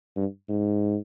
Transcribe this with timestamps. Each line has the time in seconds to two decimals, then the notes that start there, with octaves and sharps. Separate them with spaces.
0.16 G2
0.49 G#2